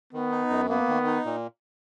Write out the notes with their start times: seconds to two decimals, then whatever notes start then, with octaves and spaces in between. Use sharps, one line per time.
0.13 D#3 B3
0.32 D#4
0.50 F#2
0.69 A#3 B3
0.88 D#3
1.06 D#4
1.25 A#2